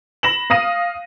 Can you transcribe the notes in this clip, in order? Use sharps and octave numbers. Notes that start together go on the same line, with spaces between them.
B5 A#6 E7 F#7
F5 D#6 A#6 D#7